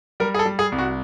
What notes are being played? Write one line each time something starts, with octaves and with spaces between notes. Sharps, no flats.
G3 A#4
G#4
A4
G3
G#4
C2
F#4